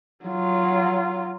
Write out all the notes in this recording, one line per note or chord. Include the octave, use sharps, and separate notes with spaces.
F#3 F4